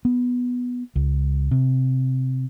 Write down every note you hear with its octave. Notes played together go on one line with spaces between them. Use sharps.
B3
C#2
C3